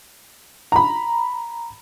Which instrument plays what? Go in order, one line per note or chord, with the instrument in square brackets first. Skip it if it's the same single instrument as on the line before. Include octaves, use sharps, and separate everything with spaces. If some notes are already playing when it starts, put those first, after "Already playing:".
[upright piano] A#5 B5